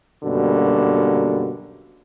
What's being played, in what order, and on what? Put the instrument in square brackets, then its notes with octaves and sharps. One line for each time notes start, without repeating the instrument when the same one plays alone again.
[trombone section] F#2 B2 D3 G3 A#3